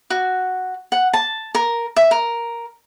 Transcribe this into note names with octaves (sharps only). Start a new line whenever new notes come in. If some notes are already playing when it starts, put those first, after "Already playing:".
F#4
F#5
A5
A#4
E5
A#4